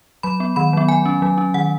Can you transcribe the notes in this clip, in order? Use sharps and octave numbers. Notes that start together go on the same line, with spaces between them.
F#3 B5
B3
D#3 B5
F#3 B3
F#3 G#5
C#4
F#3
C#4
D#3 F#5